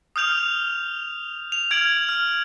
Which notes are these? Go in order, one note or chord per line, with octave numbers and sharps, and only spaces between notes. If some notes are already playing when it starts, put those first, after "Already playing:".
D#6 F6 G6 F7
F7
F6 G#6 D7 F#7
F6